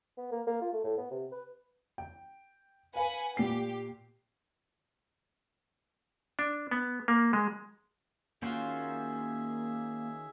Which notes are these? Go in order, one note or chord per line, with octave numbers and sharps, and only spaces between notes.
B3
A#3
A#3
F4
A3
A2
B3
C3
B4
G5
B4 F5 F#5 G#5
A#2 G4 C7
D4
B3
A#3
G#3
D#3 A#3 C#4 F4 F#4 G#4 C5 E5